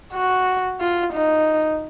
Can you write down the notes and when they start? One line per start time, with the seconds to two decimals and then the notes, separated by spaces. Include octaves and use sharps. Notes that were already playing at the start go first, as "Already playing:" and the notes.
0.13 F#4
0.80 F4
1.13 D#4